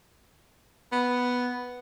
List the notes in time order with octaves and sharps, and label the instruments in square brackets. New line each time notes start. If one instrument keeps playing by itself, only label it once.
[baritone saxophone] B3